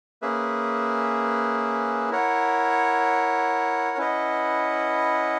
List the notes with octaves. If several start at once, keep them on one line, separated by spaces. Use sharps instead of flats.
A#3 C#4 G#4 B4 E5
E4 A#4 C#5 F#5
C#4 E4 B4 D#5 F#5